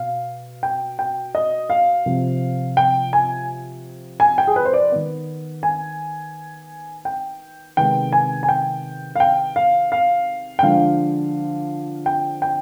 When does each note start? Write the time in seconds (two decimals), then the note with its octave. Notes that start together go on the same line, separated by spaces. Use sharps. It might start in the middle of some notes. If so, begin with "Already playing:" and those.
Already playing: B2 F5
0.63 G5
0.99 G5
1.35 D#5
1.70 F5
2.06 C3 F3 C4
2.77 G5
3.13 G#5
4.20 G#5
4.38 G5
4.47 G#4
4.56 B4
4.65 C5
4.74 D5
4.92 D#3 B3
5.63 G#5
7.05 G5
7.77 C3 D#3 G#3 B3 G5
8.13 G#5
8.43 G#5
8.49 G5
9.15 F5
9.20 G5
9.56 F5
9.92 F5
10.59 G5
10.63 D3 F3 G#3 F5
12.06 G5
12.42 G5